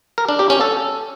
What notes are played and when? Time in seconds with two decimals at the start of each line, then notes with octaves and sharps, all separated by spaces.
0.18 A#4
0.29 D4
0.39 G4
0.50 C#4
0.61 A4